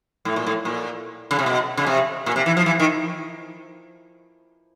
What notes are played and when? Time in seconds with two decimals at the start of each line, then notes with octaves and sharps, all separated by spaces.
0.25 A2
0.36 A#2
0.47 A2
0.65 A#2
1.31 C#3
1.39 C3
1.46 B2
1.77 C#3
1.87 C3
2.26 A#2
2.36 C3
2.46 E3
2.57 F3
2.66 E3
2.80 D#3